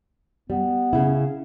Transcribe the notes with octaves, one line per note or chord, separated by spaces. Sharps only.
G3 B3
C#3 E4